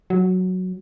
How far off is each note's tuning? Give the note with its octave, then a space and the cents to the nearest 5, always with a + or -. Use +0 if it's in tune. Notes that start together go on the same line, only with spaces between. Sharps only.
F#3 -5